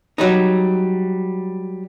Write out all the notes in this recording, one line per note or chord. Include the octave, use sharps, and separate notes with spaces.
F#3 G3 D#4